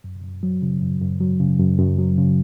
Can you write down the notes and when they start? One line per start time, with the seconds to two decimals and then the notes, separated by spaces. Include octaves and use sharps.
0.04 F#2
0.23 F#2
0.43 F#3
0.62 C#3
0.81 F#2
1.01 F#2
1.20 F#3
1.40 C#3
1.59 F#2
1.79 F#2
1.99 F#3
2.18 C#3